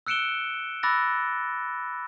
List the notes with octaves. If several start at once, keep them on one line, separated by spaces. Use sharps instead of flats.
E6 F#6 C#7 D7 E7 G7
B5 D6 E6 F#6 A6 A#6